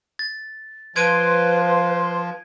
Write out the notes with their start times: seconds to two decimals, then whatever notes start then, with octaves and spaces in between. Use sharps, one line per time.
0.19 A6
0.96 F3 B4 C6 G#6 D7 D#7